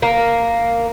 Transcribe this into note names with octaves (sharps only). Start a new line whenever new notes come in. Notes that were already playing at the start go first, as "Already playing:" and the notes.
A#3